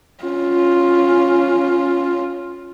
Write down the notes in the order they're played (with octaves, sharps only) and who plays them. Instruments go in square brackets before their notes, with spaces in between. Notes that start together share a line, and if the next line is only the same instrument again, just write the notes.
[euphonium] C#4 [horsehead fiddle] F4